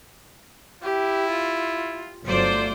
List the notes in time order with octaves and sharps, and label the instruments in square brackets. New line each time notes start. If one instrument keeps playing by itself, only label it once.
[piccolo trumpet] E4 [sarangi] G4
[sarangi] F4
[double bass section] G1 F#3 A3 [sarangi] F4 [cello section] C5 D5